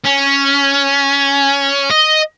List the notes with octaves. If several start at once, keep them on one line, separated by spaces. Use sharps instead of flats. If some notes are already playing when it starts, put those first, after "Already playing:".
C#4
D#5